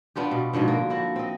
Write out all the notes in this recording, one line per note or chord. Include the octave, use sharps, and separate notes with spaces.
B3 D4 F4 G4
B2
G#2 B2 D3 F3
A#3
F3 E4 F#4
C4 D#5